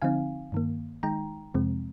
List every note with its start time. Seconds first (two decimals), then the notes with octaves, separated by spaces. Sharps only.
0.02 D3 F3 C4 D#4 F5 G#5
0.52 G2 D#3 A#3
1.03 D#3 G#3 D#4 G5 A#5
1.54 F2 C3 F3 G#3 C4